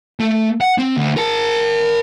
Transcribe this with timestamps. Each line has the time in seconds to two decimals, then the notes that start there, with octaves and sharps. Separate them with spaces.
0.20 A3
0.61 F#5
0.78 C4
0.97 D2
1.17 A#4 A5